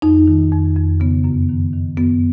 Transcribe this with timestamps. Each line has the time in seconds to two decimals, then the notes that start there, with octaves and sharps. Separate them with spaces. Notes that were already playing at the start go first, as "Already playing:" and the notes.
0.02 F2 D#4
0.28 D#3
0.52 F2
0.76 F2
1.00 C#3 B3
1.24 F#2
1.49 D#3
1.73 D#3
1.97 F#2 B3